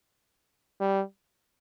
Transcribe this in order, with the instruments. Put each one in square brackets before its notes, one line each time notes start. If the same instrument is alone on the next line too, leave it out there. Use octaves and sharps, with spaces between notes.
[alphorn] G3